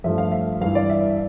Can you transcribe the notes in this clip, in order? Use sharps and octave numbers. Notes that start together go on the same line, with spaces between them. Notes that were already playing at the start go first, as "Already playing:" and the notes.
G2 F3 A3 E5
F5
E5
G2 E3 G3 F5
D5
E5